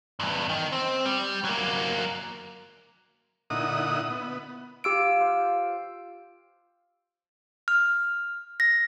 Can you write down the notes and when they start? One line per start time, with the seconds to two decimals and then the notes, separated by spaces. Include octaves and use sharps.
0.20 E2 G2
0.49 D#3
0.72 C4
1.05 G3
1.45 F#3 A#3
3.50 A#2 D3 D#4 E4 F#5 D#6
4.10 B3
4.84 F4 G4 E6 D7
5.20 C5 F5
7.68 F6
8.60 A#6